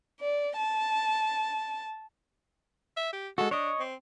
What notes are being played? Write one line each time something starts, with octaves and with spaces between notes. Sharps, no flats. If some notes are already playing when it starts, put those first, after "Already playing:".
D5
A5
E5
G4
G#3 F#4 A4
D4 C#5 D#5
C4